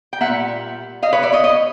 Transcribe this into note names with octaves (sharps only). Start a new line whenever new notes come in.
G5
A#2 G3 A#3 E5 F#5
D#5 F5
B4 C#5
D5 E5
C#5 D#5
C#5 D#5